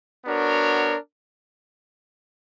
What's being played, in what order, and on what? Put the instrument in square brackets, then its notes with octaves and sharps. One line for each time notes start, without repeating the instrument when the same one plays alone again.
[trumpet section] B3 D4 F#4 A#4 C#5